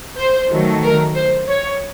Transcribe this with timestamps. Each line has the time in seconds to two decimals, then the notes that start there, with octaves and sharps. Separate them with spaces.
0.17 C5
0.50 D#3 F#3 A3
0.83 A#4
1.15 C5
1.47 C#5